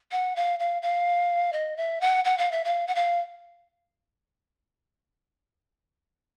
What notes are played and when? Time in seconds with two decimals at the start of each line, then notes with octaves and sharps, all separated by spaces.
0.12 F#5
0.36 F5
0.60 F5
0.82 F5
1.53 D#5
1.77 E5
2.01 F#5
2.25 F#5
2.38 F5
2.52 E5
2.65 F5
2.87 F#5
2.95 F5